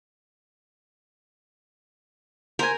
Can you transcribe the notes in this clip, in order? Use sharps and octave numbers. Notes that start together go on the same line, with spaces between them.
A#4 C5 G#5